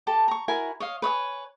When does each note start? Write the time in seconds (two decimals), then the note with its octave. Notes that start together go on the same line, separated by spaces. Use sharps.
0.07 G4 A4 A5
0.28 A#5 C#6
0.48 E4 F#4 A#4 G#5
0.80 C#5 D#5 F5
1.02 B4 C#5 D#5 G#5